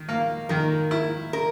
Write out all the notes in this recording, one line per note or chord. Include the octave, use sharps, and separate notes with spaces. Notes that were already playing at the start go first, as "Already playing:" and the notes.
Already playing: D#3
A#3
D#3 A#4
E4
A#4